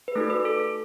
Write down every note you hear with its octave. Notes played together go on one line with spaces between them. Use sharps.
B4
A3 D#4 F#4 A4
B4
A4
A4